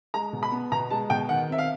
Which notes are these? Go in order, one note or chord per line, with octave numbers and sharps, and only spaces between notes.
G#3 A#5
B2
B5
B3
B2 A#5
G#3 A5
B2 G5
D#3 F#5
C4 E5
F5